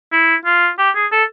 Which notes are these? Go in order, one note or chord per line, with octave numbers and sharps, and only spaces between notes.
E4
F4
G4
G#4
A4